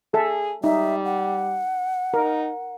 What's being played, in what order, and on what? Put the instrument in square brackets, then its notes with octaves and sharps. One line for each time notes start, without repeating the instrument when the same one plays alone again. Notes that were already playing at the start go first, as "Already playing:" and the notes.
[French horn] G#4 [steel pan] A4 E5
[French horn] G3 [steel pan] D#4 [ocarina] E5
[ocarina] F#5
[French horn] D#4 [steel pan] A#4